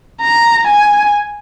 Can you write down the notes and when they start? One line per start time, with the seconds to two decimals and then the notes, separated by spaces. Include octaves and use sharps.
0.21 A#5
0.67 G#5